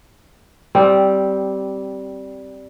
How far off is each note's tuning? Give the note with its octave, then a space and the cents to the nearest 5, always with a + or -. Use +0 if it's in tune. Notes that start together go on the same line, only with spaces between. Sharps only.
G3 -10 C4 +0